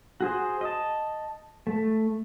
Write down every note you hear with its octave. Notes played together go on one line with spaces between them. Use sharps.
F#4 G#4 C5
D#5 A5
A3